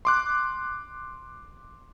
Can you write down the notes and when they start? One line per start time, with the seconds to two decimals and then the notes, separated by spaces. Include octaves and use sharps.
0.05 C6 D6 F#6